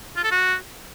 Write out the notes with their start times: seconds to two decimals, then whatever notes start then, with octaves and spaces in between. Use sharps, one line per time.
0.16 F4
0.24 A4
0.31 F#4